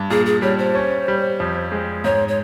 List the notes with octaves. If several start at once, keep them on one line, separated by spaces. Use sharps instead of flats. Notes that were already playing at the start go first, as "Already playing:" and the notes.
Already playing: G2
A#2 G#4
G#4
G3 C#5
C5
C#4
G3
F2
G#3
G#2 C#5
C#5